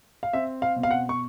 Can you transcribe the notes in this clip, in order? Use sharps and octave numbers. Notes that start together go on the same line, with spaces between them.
F5
C4 E5
F5
B2
F5
F#5
C#6